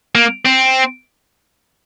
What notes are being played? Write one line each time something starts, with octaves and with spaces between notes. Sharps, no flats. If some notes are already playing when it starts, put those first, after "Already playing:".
A#3
C4